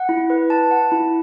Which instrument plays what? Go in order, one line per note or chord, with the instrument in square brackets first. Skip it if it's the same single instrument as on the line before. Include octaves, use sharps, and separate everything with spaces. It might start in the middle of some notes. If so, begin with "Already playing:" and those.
Already playing: [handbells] F#5
E4
B4
A5
F#5
E4